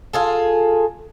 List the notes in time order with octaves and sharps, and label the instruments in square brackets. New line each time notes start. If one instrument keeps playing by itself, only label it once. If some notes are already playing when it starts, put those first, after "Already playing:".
[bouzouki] F4 G#4 A4